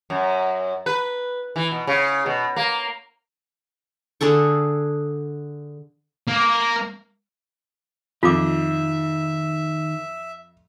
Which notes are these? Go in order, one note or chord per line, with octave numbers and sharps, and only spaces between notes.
F#2
B4
E3
B2
C#3
B2
A#3
D3 G#4 A4 C#6
A#3
F2 D#3 D#4 F4 E5 D6